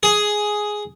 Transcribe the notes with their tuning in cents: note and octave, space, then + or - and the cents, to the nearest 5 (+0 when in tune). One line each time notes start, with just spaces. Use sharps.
G#4 +5